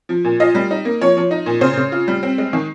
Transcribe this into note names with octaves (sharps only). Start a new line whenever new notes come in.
F3
A#2
F4 D#5
G3
D#4
A#3
F3 C#5
F3
D#4
A#2
C#3 C5
C#3
F4
G3
C4
G#3
D#3